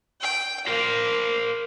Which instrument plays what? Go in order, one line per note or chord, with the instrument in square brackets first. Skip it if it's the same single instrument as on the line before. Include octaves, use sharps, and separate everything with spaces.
[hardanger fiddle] G5
[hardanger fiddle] A#3 [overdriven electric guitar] A#4 C5